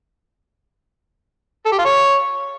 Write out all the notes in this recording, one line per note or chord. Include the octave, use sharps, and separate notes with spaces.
A4
G4
F4
C#5